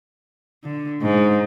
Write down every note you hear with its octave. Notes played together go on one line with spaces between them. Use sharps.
D3
G#2